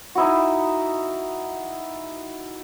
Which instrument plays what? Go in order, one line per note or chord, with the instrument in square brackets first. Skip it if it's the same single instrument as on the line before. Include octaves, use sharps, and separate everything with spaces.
[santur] D#4 E4 F#4